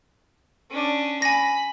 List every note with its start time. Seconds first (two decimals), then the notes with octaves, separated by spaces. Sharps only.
0.70 C#4 D4
1.22 G#5 B5 A#6